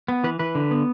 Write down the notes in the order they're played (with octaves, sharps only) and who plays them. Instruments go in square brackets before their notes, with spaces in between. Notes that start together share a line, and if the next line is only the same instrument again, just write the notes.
[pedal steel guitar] B3
E3 B4
E3 B4
D3
B3